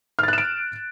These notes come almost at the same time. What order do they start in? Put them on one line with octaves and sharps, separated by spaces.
F6 A6 F#6 E7 D7